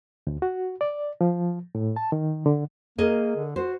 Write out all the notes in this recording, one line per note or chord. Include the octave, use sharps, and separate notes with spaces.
D2
F#4
D5
F3
A2
A5
D#3
D3
A#3 G#4 A#4 D#5
D3
F#4 C5